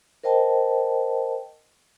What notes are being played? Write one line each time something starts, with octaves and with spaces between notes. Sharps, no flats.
A#4 C5 D#5 G5 A5